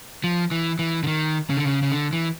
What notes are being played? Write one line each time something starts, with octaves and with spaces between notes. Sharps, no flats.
F3
E3
E3
D3
D#3
C#3
D3
C#3
C#3
D3
E3